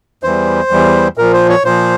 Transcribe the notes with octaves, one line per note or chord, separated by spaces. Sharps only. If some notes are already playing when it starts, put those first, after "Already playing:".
E2 E3 G3 C5
E2 E3 G3
A#2 F3 A#4
C5
C#5
A#2 F3 C5